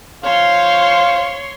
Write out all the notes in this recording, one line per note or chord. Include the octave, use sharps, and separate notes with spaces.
C5 C#5 F5 C6